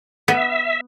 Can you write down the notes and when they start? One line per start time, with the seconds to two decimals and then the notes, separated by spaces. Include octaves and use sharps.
0.28 B3 E5